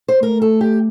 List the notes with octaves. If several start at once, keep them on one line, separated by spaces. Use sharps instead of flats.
C5
A3 A#4
A4
G4